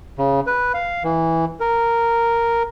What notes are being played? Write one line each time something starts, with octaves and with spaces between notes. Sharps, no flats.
C#3
B4
F5
E3
A#4